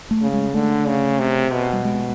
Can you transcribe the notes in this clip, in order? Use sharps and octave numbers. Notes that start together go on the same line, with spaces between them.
A3
C#3
G#3
D3 A3
C#3
C3
B2
G3
G#3